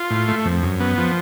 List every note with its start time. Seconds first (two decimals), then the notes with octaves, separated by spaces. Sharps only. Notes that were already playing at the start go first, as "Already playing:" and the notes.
Already playing: F4
0.11 A2
0.28 A3
0.45 F2
0.63 F#2
0.80 B3
0.98 F3